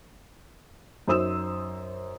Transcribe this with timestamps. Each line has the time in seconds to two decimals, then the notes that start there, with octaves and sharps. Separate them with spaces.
1.08 F#2 D#4 C5 D#6 E6 E7